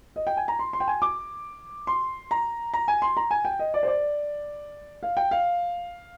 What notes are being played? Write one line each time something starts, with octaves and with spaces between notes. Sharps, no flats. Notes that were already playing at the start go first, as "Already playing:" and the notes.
D#5
G5
G#5
A#5
C6
C6
G5
G#5
D6
C6
A#5
A#5
G#5
C6
A#5
G#5
G5
D#5
D5
C5
D5
F5
G5
F5